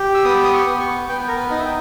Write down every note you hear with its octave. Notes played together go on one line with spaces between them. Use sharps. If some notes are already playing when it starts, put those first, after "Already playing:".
Already playing: G4
E6
B3 D#6
D#6
C#6
B3
C#6
B3 G5
A#4
B4
D#4
E5
G5